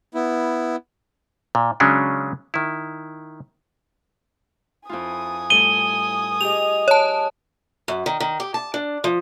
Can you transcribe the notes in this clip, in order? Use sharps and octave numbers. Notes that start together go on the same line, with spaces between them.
B3 E4
A#2
C#3 F#3 G#3 C#4 D4
D#3 E4
F2 E4 F4 G#5 D#6
A2 G3 A4 D#7 G7
G4 G#4 D#5 F7
C#5 A5
F#2
D#3
D#3
G4
A5
D4
F3